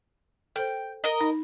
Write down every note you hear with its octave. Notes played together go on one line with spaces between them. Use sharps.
A4 C5 G5
A#4 D#5
D#4